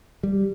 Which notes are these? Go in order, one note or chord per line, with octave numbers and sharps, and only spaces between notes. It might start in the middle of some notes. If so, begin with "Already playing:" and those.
G3